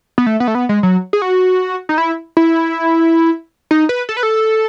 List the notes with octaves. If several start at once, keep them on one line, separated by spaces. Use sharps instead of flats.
B3
A3
B3
A3
B3
G#3
F#3
G#4
F#4
D#4
E4
E4
D#4
B4
A4
B4
A4